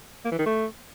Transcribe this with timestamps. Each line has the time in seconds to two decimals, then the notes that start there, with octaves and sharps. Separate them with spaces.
0.25 A#3
0.32 E3
0.39 D#3
0.46 A3